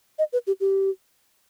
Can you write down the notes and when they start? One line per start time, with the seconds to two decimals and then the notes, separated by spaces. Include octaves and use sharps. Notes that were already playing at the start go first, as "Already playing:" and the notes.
0.19 D#5
0.33 B4
0.47 G4
0.61 G4